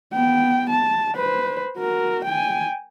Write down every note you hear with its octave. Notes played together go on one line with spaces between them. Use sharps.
B3 G5
A5
B4 C5
F#4 A#4
G5 G#5